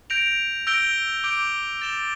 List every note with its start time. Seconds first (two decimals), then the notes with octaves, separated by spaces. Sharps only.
0.10 G6 A#6 D7 F7
0.67 E6 G6 A#6 D7 G7
1.24 D6 G6 D7 G7
1.81 A6 E7 G7